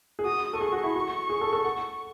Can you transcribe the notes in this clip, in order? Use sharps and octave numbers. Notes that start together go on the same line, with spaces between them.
G#4
F#4 D#6
A4
G#4 C#6
F#4
E4
F#4
G#4
A4
A4
F#5